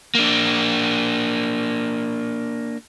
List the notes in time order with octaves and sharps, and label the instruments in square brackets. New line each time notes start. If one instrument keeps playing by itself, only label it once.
[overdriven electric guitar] A#3 D4